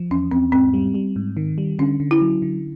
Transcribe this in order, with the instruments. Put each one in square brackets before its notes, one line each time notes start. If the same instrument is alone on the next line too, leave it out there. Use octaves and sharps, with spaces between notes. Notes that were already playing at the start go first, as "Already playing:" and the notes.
Already playing: [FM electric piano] F3
[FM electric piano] E2 [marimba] C#4
[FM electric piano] E2 [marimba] C4
[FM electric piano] G#2 [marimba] C4
[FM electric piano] G3
G3
G#2
D#3
G3
[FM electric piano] D3 [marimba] C#4
[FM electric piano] D3
[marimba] E4
[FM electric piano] F#3
D3